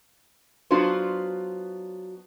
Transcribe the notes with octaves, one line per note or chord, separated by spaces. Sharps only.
F#3 B3 D4 F4 F#4 C5